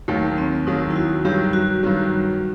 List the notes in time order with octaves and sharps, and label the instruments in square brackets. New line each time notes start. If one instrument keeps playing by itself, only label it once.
[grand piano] D#2 D#3 F#3 [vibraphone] A3
[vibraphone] C4
[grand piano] D#2 D#3 F#3 [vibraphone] D#4
[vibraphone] E4
F#4
[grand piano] G2 D#3 F#3 [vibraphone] G4
[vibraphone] F#4
[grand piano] G2 D#3 F#3